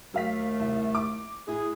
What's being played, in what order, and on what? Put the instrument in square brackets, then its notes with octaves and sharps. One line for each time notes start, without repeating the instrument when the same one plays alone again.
[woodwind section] D#2 A3 [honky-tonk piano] F#3 F5 B6
[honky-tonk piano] C2
D6
[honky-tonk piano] A2 [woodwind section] G#4